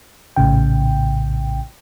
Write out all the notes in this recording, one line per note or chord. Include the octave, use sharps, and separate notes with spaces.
A#1 A2 C#3 G5